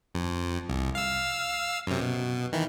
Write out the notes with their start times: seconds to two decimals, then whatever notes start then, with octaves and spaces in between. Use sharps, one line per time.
0.15 F2
0.69 C2
0.95 F5 E6
1.87 F#2 C3
2.01 B2
2.53 D#3 E3